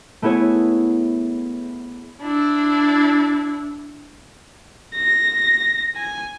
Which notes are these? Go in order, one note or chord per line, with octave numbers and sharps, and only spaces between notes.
A3 B3 E4 G#4 C#5
D4 E4
A#6
G#5